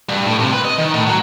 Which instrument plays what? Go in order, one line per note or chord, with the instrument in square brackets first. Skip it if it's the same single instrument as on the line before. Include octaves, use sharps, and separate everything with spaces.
[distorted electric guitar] G2
A2
C3
B4
D#5
D#3
A2
F#3